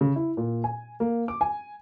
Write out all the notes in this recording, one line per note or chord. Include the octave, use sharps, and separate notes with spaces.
C#3
E4
A#2
G#5
A#3
D6
G#5